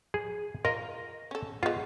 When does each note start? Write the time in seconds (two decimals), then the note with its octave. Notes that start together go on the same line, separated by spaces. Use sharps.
0.14 G#4
0.65 F4 A#4 D#5
1.31 C#4 A4
1.63 G#3 B3 F4